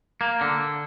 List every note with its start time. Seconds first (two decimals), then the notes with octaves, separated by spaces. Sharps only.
0.21 A#3
0.41 D3